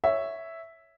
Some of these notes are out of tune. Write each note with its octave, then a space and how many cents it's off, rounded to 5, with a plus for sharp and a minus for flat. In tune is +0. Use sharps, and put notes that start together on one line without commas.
C#5 +0 E5 +0